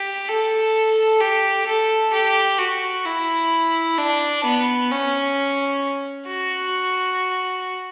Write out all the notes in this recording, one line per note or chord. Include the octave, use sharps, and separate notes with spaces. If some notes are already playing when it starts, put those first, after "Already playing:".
Already playing: G4
A4
G4
A4
G4
F#4
E4
D4
B3
C#4
F#4